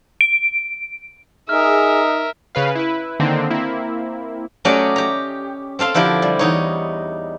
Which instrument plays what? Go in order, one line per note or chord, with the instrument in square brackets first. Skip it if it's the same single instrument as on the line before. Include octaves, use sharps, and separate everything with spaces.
[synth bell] D7
[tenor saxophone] D#4 [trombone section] G#4 [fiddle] A#4 E5 [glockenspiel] F6
[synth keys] C#3 B4 F5
E4 B4
D3 D#3 A#3 C4 D#4
A#3 C4 E4
[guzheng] F#3 A3 C#4 G4 D5 D#5
G4 A#5
C4 A4 F5 C6
D3 F3 E4 G4 A#4
G3
E2 D#4 C#5